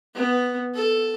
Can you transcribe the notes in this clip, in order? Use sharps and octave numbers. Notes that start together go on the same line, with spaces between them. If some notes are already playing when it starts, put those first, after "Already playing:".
B3
A4